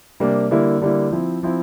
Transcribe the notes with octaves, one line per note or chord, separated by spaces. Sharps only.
C3 G3 A#3 D4
D3 G3 A#3 E4
D3 G3 A#3 E4
F3 C4 E4
F3 C4 E4